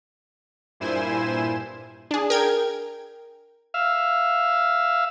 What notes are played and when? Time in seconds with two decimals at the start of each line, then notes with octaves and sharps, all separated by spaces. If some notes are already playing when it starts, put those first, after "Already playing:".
0.80 G2 A#2 E4 C5 G#5 E7
2.11 D4 G#4
2.30 A#4 G5 G#6
3.74 E5 F5